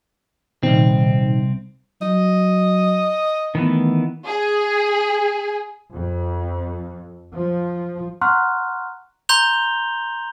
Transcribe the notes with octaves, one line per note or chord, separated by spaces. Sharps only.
C2 A#2 D#3 C4 D#4
F#3 D#5
D#3 E3 A3 B3
G#4
F2
F3
F#5 A#5 C6 C#6 F6 F#6
A#5 C6 G6 F7 G7